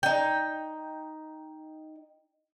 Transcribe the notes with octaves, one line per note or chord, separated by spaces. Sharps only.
D#4 G5